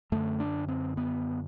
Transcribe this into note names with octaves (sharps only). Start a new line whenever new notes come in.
F#2 D3 A3
D4
C4
B3